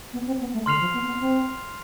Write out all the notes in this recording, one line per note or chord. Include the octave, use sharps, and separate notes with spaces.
B3
C4
B3
A3
D3 C6 F6 C7 F7
F3
B3
B3
C4